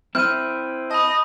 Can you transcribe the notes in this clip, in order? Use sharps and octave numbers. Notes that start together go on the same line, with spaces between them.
C4 E4 F6 G6 D#7
D#5 A5 B5